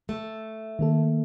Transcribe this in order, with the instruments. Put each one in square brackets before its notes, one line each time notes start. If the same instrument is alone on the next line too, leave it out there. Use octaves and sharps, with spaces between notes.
[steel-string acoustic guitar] A3
[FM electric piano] D#3 A#3 A4